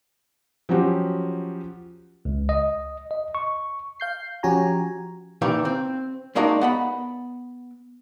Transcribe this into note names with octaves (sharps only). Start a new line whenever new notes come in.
F3 F#3 C#4 F#4 G4
C#2
D#5
D#5
C#6
F5 G6 C7
F3 C#4 F#4 G4 G#5 A#5
A#2 D#3 E3 G4
C4
G3 G#3 A#3 D4 D#4 F#4
B3 F#5 B5